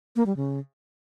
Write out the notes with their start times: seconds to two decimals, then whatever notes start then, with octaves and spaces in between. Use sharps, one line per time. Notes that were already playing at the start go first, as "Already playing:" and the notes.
0.16 A#3
0.26 G3
0.36 C#3